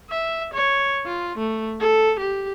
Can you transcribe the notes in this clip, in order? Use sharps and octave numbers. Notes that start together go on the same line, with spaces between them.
E5
C#5
F4
A3
A4
G4